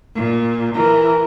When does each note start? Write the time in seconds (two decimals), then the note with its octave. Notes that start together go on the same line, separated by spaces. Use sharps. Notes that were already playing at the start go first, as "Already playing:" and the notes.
0.16 A#2
0.75 E3 A#4